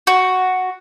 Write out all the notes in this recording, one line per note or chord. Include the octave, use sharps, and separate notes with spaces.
F#4